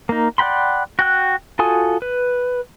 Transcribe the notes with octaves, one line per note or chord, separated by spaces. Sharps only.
A#3 D#4
D5 F#5 G5 B5 C6
F#4 G5 F#6
F4 F#4 A4 G#5 D#6
B4